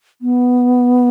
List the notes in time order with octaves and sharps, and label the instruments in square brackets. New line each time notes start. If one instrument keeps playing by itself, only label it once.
[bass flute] B3